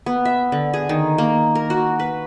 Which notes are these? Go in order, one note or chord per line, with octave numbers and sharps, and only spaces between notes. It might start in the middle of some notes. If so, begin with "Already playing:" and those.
B3
E5
D3
G#4
D#3
A#3
A#4
F#4
B4